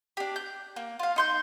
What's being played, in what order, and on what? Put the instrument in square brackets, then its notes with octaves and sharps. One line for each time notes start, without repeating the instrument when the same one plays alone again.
[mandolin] D4 G4
G6
A#3
F4 F5
D#4 C6 G6